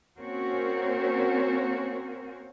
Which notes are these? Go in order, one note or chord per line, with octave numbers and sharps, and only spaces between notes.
A#3 C4 C#4 F#4 A#4 C5